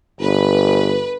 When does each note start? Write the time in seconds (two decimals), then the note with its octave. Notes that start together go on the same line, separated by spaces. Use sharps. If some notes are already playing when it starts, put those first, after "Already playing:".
0.21 G1 B4